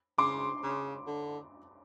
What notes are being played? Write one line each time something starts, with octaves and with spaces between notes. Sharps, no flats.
C#3 C6 D6
C#3
D3